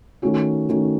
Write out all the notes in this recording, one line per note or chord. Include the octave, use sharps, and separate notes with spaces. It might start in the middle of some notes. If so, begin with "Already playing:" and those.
D#3 A3 C#4 F#4
D#3 A3 C#4 F#4